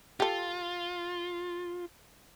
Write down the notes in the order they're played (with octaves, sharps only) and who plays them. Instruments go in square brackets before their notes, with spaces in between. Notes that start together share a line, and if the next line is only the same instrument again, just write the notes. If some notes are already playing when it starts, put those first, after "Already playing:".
[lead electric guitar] F4 [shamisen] G4 A4